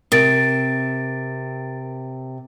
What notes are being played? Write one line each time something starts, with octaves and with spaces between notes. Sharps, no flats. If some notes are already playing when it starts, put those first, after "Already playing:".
C3 A#4 A6 D7